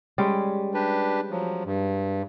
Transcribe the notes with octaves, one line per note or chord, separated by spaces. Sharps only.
G3 G#3 C#4
D4 G4 B4
F3 F#3
G2